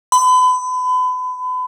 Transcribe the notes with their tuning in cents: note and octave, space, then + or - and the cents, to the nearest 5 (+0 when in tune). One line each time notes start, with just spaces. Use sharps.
B5 +35